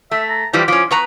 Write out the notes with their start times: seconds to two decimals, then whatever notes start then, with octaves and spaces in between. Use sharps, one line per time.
0.11 A3 E5
0.29 A#5
0.53 E3 F3 G3 G4
0.68 F3 C#4 D6
0.91 B3 B4 A#5 C#6